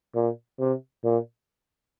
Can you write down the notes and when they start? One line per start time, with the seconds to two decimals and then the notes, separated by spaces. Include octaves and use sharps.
0.15 A#2
0.60 C3
1.04 A#2